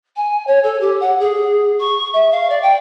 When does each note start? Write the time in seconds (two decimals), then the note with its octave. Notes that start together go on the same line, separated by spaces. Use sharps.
0.16 G#5
0.47 C#5
0.63 A4
0.80 G4
1.00 F#5
1.20 G#4
1.80 C#6
2.13 E5
2.31 F5
2.49 D5
2.62 G5